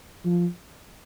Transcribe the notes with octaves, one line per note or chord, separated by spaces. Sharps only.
F3